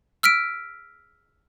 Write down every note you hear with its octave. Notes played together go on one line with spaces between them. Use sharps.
E6 F6 B6 D7